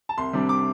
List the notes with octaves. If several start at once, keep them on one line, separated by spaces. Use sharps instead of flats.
A5
C2 C6
C3 G3 D4
D6